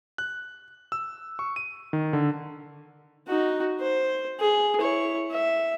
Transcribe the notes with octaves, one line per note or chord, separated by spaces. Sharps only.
F#6
E6
C#6
D#7
D#3
D3
D#4 F#4
C5
G#4
E4 C#5
E5